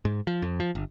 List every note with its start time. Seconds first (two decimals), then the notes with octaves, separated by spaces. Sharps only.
0.05 G#2
0.27 F3
0.42 F2
0.60 F3
0.75 G1